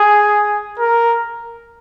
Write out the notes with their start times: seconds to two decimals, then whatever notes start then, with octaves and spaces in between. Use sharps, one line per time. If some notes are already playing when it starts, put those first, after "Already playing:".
Already playing: G#4
0.79 A#4